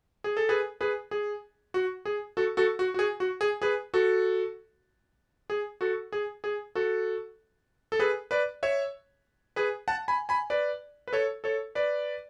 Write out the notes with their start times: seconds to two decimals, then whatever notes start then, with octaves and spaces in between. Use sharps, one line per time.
0.24 G#4
0.37 A4
0.49 G#4 B4
0.81 G#4 B4
1.11 G#4
1.74 F#4
2.05 G#4
2.37 F#4 A4
2.57 F#4 A4
2.79 F#4
2.94 F#4
2.99 G#4
3.20 F#4
3.41 G#4
3.62 G#4 B4
3.94 F#4 A4
5.50 G#4
5.81 F#4 A4
6.12 G#4
6.44 G#4
6.75 F#4 A4
7.92 A4
7.99 G#4 B4
8.31 B4 D5
8.63 C#5 E5
9.56 G#4 B4
9.88 F#5 A5
10.08 G#5 B5
10.29 G#5 B5
10.50 B4 D5
11.08 B4
11.13 A4 C#5
11.44 A4 C#5
11.75 B4 D5